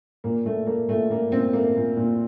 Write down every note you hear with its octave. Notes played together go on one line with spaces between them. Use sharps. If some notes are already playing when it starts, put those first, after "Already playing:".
A#2 A#3
A#2 A3
A3 A#3
A#2 A3
A#2 A#3
A#2 C4
A3 A#3
A#2
A#2